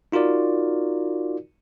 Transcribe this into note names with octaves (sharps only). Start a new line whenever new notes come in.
D#4 F4 F#4 A#4 D5